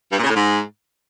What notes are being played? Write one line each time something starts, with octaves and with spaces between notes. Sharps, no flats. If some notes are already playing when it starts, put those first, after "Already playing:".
G2
A#2
C#3
A2
G#2